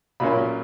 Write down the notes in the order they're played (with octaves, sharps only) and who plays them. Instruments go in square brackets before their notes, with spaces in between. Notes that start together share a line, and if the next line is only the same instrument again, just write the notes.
[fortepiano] B1 A#2 A#3 C#4 B5